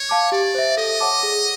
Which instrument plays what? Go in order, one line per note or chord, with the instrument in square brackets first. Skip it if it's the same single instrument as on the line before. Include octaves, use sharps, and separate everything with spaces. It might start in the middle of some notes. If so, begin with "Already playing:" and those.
Already playing: [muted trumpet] C#5
[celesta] F5 A5 D6
[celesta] G4 [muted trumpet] D5
[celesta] C5 E5
[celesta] A4 [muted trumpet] D#5
[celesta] C#5 F#5 A5 D6
G#4